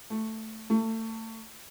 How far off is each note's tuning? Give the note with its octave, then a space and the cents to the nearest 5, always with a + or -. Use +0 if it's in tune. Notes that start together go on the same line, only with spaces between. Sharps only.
A3 +5
A3 +30